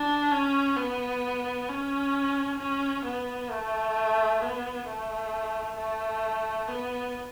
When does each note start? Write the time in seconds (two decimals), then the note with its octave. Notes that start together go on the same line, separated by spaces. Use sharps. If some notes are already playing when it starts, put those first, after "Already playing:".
Already playing: D4
0.31 C#4
0.76 B3
1.68 C#4
2.58 C#4
3.04 B3
3.50 A3
4.42 B3
4.87 A3
5.77 A3
6.68 B3